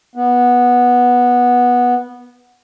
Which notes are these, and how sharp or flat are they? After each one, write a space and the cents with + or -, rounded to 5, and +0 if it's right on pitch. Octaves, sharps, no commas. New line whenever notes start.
B3 -10